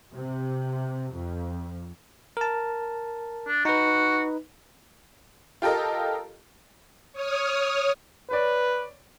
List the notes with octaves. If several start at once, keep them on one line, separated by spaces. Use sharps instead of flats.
C3
F2
A#4 A5
D4
D#4 F#4 B4
F4 G4 A4 A#4 D#5
C#5 D#6 F6
B4 C#5 D5